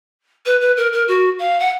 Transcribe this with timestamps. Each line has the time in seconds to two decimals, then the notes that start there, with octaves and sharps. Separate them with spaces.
0.46 B4
0.61 B4
0.77 A#4
0.92 A#4
1.08 F#4
1.39 F5
1.59 F#5